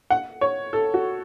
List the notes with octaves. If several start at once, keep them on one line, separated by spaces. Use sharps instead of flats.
F#5
C#5
A4
F#4